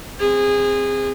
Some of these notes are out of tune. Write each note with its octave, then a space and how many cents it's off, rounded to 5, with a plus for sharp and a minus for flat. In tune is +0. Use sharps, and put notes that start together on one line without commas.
C4 -5 G#4 -25